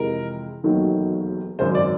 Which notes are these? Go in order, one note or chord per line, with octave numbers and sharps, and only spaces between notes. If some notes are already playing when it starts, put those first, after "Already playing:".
Already playing: F2 C3 E3 G#3 A#4
E1 D#2 D#3 F#3 A3
G#1 F#2 C#3 C5
D5